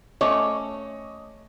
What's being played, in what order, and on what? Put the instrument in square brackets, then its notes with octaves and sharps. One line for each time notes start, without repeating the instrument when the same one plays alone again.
[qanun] A3 C#4 [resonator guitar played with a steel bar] C#5 [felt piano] D#5 [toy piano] D6